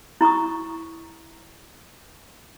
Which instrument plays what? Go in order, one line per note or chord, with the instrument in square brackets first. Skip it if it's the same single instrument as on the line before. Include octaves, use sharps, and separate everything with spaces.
[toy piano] E4 A#5 C#6 D#6